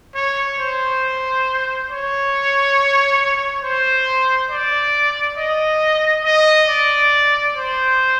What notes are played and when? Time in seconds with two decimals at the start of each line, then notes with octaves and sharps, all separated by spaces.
0.15 C#5
0.60 C5
1.90 C#5
3.64 C5
4.51 D5
5.37 D#5
6.24 D#5
6.69 D5
7.56 C5